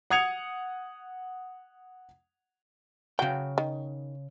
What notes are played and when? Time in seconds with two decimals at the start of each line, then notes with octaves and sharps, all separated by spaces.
0.10 F#5 D#6 G#6 C#7 F7
3.19 C#3 F#3 G5
3.58 D#3